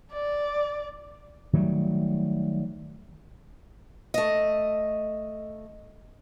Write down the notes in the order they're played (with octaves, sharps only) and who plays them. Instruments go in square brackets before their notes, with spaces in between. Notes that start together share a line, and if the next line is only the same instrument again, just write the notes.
[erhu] D5
[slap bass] D#3 F#3 G3 A3
[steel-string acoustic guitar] A3 D#5